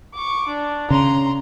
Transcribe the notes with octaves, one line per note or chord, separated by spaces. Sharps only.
C#6 D6
D4
C#3 A#5 C6